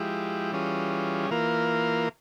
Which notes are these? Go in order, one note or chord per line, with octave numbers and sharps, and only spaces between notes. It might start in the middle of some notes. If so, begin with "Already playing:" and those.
Already playing: F3 G#3 E4 G4
E3 G3 C#4 F4 G#4
E3 A#3 F4 A#4